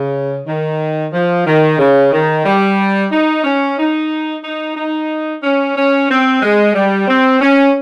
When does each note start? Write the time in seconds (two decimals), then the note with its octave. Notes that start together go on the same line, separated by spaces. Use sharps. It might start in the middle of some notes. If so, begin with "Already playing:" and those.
Already playing: C#3
0.47 D#3
1.13 F3
1.47 D#3
1.79 C#3
2.12 D#3
2.45 G3
3.12 D#4
3.44 C#4
3.78 D#4
4.44 D#4
4.77 D#4
5.43 C#4
5.77 C#4
6.09 C4
6.42 G#3
6.75 G3
7.08 C4
7.41 C#4